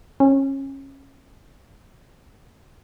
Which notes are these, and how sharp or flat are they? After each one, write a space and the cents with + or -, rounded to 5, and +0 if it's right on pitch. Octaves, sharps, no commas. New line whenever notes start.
C#4 -25